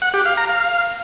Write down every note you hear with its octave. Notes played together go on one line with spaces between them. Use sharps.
F#5
G4
F5
A#5
F5